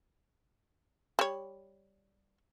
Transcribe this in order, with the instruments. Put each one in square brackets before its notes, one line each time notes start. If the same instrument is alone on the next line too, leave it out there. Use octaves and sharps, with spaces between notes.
[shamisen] G3 C#5